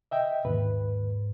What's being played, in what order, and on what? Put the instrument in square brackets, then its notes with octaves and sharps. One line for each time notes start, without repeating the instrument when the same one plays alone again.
[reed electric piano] D#5 E5 G5
[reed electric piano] D#2 B4 [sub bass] G#2